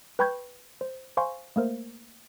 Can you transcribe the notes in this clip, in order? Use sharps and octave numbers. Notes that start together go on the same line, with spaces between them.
B4 G5 B5 C#6 G6 G#6
C5
C5 F5 G#5 C6 C#6
A3 A#3 A#4 C5